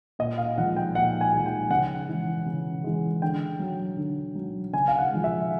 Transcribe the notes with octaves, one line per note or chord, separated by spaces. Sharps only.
A#2 D#5
F5
F3 G#3 F#5
G5
A#2 F#5
G#5
F3 G#3
G5
C#3 F#5
E3 G#3
C#3
E3 G#3
D3 G5
F#3
D3
F#3
C#3 G#5
F5
F#5
F3 G#3
E5